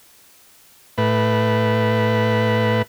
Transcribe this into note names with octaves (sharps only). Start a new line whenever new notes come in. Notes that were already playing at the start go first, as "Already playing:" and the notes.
A2 B4